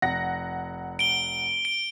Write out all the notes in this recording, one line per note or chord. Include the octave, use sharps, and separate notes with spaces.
F1 F#5 A#6
D7 G7
D7